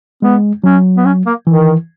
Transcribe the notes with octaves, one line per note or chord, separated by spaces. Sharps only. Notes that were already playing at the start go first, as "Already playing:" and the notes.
G#3 B3
F#3 C#4
B3
C#4
A#3
D#3 E3